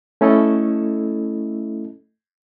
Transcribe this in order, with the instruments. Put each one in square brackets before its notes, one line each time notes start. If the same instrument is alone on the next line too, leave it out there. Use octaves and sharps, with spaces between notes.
[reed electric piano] A3 C#4 E4 A4 D#5